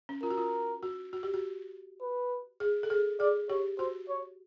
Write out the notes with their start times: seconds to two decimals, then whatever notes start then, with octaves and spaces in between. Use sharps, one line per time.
0.09 C#4
0.23 F4 A#4
0.30 F#4
0.37 F4
0.83 F#4
1.13 F#4
1.23 G4
1.34 F#4
2.01 B4
2.60 G#4
2.83 A4
2.90 G#4
3.20 G#4 D5
3.49 G4 C#5
3.79 F#4 C5
4.09 C#5